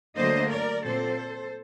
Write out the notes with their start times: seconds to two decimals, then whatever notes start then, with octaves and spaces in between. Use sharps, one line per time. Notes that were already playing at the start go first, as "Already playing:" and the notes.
0.17 D2 D3 F#3 A#3 D4 C5 D#5
0.51 A#4 D5
0.84 A#2 F#3 C4 A4 C5